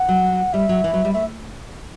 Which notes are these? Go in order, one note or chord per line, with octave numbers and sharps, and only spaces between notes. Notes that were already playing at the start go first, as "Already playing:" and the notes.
Already playing: F#5
F#3
G3 E5
F#3
E3
F#3
G3
A3 E5